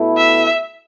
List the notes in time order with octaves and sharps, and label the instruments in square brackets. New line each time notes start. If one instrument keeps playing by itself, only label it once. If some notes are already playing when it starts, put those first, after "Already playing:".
Already playing: [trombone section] B2 A3 E4
[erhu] E5